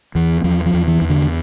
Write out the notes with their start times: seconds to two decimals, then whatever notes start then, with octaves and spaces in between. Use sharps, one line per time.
0.15 E2 E3
0.44 E2 F3
0.66 F3
0.74 E2
0.88 E3
1.02 E2
1.10 D3